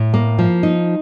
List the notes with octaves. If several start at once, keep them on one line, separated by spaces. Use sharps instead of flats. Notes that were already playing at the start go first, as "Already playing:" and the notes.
Already playing: A2
A#3
F3
D#4